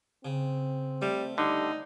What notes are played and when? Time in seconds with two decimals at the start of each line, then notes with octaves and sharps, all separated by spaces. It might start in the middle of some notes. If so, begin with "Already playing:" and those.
0.25 C#3 C4
1.02 G3 A3
1.38 D3 G3 D#4